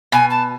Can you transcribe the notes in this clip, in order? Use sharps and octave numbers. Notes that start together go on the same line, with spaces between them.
B2 G#5
A5